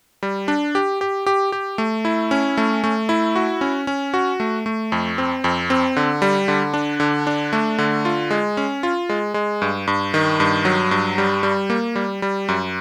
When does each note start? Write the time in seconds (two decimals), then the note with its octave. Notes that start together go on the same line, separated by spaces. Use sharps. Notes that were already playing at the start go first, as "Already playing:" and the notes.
0.23 G3
0.48 D4
0.75 G4
1.01 G4
1.26 G4
1.52 G4
1.78 A3
2.05 E4
2.31 C#4
2.57 A3
2.84 A3
3.09 E4
3.36 F#4
3.61 C#4
3.87 C#4
4.14 F#4
4.40 A3
4.66 A3
4.92 F2
5.18 C4
5.44 F2
5.70 C4
5.96 D3
6.22 G3
6.48 D3
6.74 D4
7.00 D3
7.27 D4
7.53 A3
7.78 D3
8.05 F4
8.31 G#3
8.57 C#4
8.83 F4
9.09 G#3
9.34 G#3
9.62 G2
9.87 G2
10.14 D#3
10.40 G2
10.65 F#3
10.91 G2
11.18 G3
11.43 G3
11.70 A#3
11.96 G3
12.22 G3
12.48 F#2